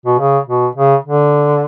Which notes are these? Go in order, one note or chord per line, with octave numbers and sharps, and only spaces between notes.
B2
C#3
B2
C#3
D3